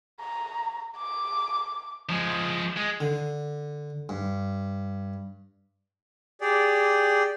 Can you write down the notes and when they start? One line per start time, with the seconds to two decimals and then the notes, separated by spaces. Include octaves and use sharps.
0.21 A#5
0.97 D6
2.09 F3 G#3
2.77 G#3
3.00 D3
4.09 G2
6.41 G4 G#4 D5